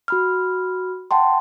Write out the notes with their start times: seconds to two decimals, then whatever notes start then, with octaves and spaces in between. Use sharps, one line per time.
0.08 F#4 B5 F6
1.11 F#5 G5 A5 C6